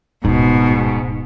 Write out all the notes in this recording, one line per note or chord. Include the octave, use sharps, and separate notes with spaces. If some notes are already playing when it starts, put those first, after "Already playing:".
D1 G#2 B2